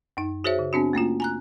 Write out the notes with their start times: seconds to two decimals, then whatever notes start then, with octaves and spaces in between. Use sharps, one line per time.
0.17 F#2 D#4
0.44 F#4 G#4 C5 C#5 E5
0.59 C#3
0.73 B3 C4 D4 F#4
0.93 A3 A#3 C#4 F4
1.20 G#5 A#5 F#6